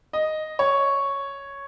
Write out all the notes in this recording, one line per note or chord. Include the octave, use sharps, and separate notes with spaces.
D#5
C#5